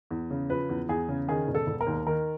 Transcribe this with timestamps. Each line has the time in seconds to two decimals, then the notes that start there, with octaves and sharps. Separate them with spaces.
0.11 E2
0.31 C#3
0.50 F3 B4
0.69 E2
0.89 E2 G#4
1.09 C#3
1.28 D#3 G#4
1.48 E1
1.55 A4
1.67 E1
1.81 A#4
1.87 D#2
2.06 D#3 A#4